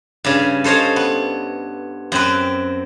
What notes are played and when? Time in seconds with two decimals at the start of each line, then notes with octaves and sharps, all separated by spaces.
0.24 G2 C#3
0.64 A4 C5 C#5 D#5 F5
0.96 B3
2.12 F#2 C4 B4